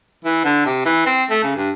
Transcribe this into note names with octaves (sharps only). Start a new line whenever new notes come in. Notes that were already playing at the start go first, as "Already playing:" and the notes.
E3
D3
C3
E3
C4
A3
C#3
G2